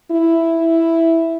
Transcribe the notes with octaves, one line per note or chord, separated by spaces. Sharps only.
E4